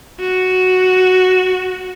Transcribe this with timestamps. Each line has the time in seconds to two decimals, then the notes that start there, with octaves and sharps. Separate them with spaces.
0.20 F#4